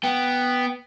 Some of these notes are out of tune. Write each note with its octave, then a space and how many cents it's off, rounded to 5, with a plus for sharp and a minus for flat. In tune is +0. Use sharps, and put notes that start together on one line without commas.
B3 +0 G5 +0